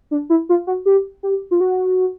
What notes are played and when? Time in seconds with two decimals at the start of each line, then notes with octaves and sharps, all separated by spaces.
0.11 D4
0.30 E4
0.49 F4
0.67 F#4
0.86 G4
1.23 G4
1.51 F4
1.61 F#4